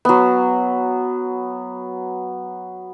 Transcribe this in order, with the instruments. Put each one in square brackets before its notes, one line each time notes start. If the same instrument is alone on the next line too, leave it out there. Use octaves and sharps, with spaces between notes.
[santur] F#3 B3